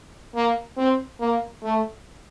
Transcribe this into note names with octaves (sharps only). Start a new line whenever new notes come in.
A#3
C4
A#3
A3